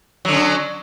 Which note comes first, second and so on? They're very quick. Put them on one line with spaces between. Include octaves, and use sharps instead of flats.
F#3 D3 C#4